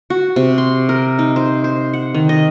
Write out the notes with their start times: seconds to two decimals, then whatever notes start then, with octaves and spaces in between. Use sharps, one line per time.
0.10 F#4
0.36 C3
0.58 C6
0.89 A#4
1.19 D#4
1.36 C5
1.64 C5
1.93 F#5
2.14 D#3
2.29 D#5